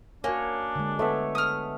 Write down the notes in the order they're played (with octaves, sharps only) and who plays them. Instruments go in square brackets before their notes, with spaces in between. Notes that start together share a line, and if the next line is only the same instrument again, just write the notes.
[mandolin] A#3 [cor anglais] D4 [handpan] F#4 C#5 [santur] G#5
[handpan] D3 G#3
[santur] A3 B3 E5 [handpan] C#5
[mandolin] D#6 F6